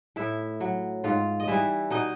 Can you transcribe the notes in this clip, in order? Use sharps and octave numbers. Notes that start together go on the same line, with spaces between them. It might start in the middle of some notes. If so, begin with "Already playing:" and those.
A2 E4 E5
F#3
G#2 F4 F5
D#5
E3 G3 E4 E5
B2 D#4 D#5